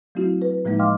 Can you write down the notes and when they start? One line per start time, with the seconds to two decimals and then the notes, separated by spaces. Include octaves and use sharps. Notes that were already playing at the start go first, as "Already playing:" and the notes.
0.15 F#3 A3 C4 E4 F#4
0.42 B4
0.65 A2 F3 G3 G#3 A#3 D#4
0.79 D#5 F5 G5 C6 D6 F6